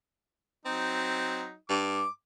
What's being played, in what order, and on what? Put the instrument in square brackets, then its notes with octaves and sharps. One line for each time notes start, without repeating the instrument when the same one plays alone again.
[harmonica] F#3 D#4 [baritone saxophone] C4
[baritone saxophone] G2 [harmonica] D6